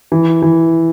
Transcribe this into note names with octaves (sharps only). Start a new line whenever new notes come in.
E3
E3